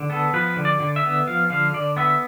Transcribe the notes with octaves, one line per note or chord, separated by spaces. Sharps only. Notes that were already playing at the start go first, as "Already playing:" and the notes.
Already playing: D3
B3 A4
F3 B4
D3
D5
D3
E5
B3
F3 F5
D3 F5
D3 D5
B3 E5